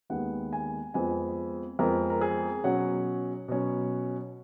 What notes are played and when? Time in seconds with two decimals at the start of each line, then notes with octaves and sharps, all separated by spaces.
0.10 D#2 D#3 G#3 B3 F#5
0.53 G#5
0.94 F2 F3 G#3 B3 G#5
1.79 F2 F3 G#3 B3 A#4
2.10 A#4
2.21 G#4
2.64 B2 F#3 C#4 F#5
3.48 B2 F#3 C#4